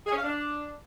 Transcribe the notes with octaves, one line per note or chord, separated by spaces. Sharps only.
G#4
C#4
F5
D4